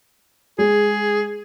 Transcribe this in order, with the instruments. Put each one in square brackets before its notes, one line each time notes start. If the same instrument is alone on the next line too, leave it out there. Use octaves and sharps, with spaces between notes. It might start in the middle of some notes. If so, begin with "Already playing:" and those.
[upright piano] G#3 [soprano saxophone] G#4